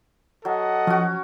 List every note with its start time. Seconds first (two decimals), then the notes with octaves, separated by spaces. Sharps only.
0.45 F#3 A4 D#5 F#5
0.87 F3 C#4 F#4